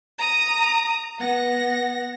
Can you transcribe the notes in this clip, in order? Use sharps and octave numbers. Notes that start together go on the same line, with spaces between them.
A#5 D#6
B3 F#5 A#6